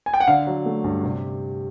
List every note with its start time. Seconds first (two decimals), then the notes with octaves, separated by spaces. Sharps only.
0.06 G#5
0.14 G5
0.20 F#5
0.28 D3 F5
0.47 F#3
0.66 A3
0.84 G2
1.03 C3